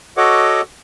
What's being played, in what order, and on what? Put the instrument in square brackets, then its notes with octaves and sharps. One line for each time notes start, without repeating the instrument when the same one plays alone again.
[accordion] F#4 A4 C#5 D#5 F#5 D6